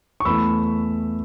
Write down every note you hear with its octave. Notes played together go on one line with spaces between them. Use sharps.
C#6
E2 E3 A3 B5 E6